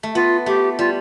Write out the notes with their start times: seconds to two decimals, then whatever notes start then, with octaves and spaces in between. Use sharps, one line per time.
0.03 A3
0.15 B3 F4
0.46 A3 G4
0.79 G3 F4